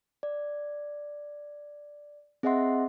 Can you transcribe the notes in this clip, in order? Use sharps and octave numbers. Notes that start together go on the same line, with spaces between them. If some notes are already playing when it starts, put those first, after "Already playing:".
D5
C4 G#4 D#5 E5 F#5 C6